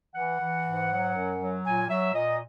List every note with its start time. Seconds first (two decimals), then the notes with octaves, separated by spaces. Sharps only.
0.15 E3 F#5
0.41 E3
0.65 G#2
0.90 F#3
1.14 F#2
1.40 F#3
1.65 A#2 G#5
1.89 F#3 E5
2.14 A#2 D#5